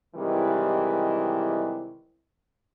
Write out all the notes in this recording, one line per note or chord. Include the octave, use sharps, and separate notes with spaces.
C3 D#3 E3 G3 G#3 E4